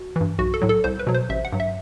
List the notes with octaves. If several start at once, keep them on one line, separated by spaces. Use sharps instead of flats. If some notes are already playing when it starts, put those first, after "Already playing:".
Already playing: F#4
G2 E3
B1 F#4
A4
A2 F#3
A4
C2 C5
B4
B2 F#3
C5
A1 E5
F#5
G2 F#3
E5